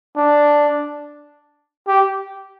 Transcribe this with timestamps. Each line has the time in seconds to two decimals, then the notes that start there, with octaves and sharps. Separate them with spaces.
0.16 D4
1.87 G4